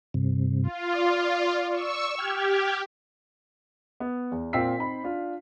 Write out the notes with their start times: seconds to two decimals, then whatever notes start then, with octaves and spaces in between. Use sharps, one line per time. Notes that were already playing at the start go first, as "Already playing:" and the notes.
0.14 G2 C3
0.63 F4
0.93 D5
1.71 C#6 E6
2.18 G4 G5 F6 G#6
4.00 B3
4.32 E2
4.53 A#2 C4 F4 E6 B6 C7
4.79 C4 D#4 B5
5.04 D4 F4